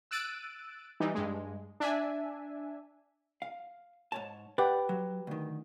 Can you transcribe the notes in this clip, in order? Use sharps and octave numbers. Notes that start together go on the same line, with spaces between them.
E6 F#6 A6 D7 D#7
E3 G3 D#4
G2 G#3
D4 E5 G#5
F5
G#2 C#5 A5
G4 B4 D5 F#5
F#3
D2 D#3